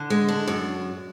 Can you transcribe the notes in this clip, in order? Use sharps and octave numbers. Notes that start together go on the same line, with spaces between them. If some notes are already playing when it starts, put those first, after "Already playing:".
Already playing: D3
G#3
D4
F#2